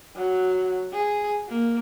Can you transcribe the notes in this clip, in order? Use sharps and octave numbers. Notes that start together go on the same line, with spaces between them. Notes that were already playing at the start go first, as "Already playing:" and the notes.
F#3
G#4
A#3